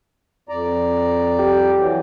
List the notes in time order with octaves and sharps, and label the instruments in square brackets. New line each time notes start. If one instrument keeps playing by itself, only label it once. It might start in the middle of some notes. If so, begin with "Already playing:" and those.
[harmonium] F2 D5 A#5
[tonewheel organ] G4
[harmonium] E3 F#3